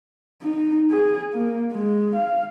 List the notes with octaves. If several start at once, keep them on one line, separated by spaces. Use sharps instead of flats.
D#4
G#4
A#3
G#3
F5